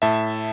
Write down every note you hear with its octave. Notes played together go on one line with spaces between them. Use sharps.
A2 E5 A5